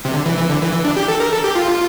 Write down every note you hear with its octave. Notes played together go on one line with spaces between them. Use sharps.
C3
D3
E3
E3
D3
E3
E3
D4
G4
A4
A#4
A4
G4
F4